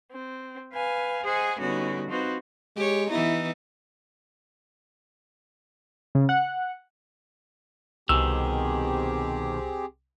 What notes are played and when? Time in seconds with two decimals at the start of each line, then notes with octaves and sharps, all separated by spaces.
0.11 C4
0.73 B4 F5 G#5
1.24 G#4 C5 D#5 F#5 G#5
1.58 D3 G3 B3 C#4 D#4 F#4
2.09 C4 D#4 F4 F#4 B4 C5
2.76 G#3 G4 C#5
3.10 E3 B3 D#4 E4
6.15 C#3
6.29 F#5
8.09 C2 B2 D#3 C4 G4 G#4 E6